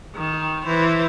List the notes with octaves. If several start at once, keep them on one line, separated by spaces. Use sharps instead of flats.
D#3
E3 C5